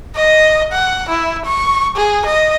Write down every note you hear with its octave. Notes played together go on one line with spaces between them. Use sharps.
D#5
F#5
E4
C#6
G#4
D#5